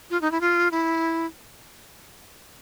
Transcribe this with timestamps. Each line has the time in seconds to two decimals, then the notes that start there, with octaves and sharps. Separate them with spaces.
0.10 F4
0.21 D#4
0.31 E4
0.41 F4
0.71 E4